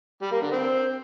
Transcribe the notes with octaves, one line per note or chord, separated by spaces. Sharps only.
G3
A#3
D3
C4